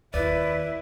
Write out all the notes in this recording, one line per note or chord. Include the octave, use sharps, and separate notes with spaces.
D#2 E4 B4 D5